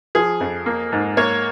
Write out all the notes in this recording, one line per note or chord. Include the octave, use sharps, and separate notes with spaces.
F3 G#4
F2
A#3
G#2
A#3 C#5